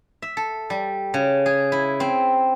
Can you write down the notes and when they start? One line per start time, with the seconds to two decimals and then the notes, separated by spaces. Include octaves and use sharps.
0.22 E5
0.37 A4
0.70 G3
1.14 C#3
1.46 G#4
1.72 E4
2.00 C4